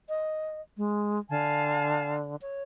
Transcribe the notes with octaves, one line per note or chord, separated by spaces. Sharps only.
D#5
G#3
D3 F5 G#5 A5
C#5